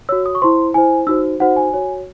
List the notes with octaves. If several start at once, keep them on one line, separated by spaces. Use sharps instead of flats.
F#4 C#5 E6
D#6
C#6
E4 C5 C6
E4 C5 G#5
D#4 F#4 C5 E6
D#4 F#4 C5 F#5
G#5
F#4 C#5